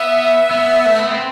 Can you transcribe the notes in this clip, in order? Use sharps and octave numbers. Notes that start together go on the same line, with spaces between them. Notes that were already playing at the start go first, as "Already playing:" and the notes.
Already playing: B3 E5
B3
A3
B3
C4